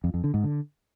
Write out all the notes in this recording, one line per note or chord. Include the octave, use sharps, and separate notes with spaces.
F2
F2
D3
G#2
D3